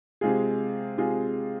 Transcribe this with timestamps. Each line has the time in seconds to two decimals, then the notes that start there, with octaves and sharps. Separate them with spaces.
0.21 C3 G#3 F4 G#4
0.98 C3 G#3 F4 G#4